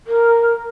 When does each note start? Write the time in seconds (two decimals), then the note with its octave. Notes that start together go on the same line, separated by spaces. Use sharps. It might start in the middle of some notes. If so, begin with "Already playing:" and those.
0.07 A#4